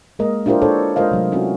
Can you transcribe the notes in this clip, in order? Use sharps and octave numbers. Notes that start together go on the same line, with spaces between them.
G#3 A#3 A#4 D#5
D4 E4 F4 G4 A#4 C5
D4 A4 C5 C#5
G#3 F4 A#4 C5 D#5 F5
C3 F#3 A3
C4 C#4 E4 F#4